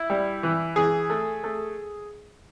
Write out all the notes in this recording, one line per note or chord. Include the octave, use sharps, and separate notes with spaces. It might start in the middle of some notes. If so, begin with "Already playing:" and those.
Already playing: E4
G3
E3
E3 G#4
A3
A3